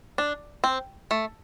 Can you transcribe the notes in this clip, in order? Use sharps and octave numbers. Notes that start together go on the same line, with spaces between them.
D4
C4
A3